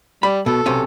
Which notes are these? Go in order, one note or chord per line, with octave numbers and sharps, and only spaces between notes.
G3 B5
B2 A4
B1 C3 C#4